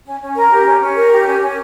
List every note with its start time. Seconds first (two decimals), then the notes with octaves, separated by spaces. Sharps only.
0.05 C#4
0.20 C#4
0.35 A#4
0.51 G4
0.66 C#4
0.81 C#4
0.96 A#4
1.11 G4
1.26 C#4
1.41 C#4